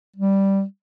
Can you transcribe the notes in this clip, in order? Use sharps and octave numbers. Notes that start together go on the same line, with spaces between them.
G3